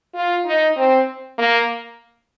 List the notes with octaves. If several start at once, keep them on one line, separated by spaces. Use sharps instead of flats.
F4
D#4
C4
A#3